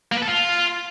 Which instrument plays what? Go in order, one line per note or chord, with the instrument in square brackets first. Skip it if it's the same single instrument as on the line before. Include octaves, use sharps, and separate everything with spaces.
[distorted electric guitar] A#3
B4
A4
F4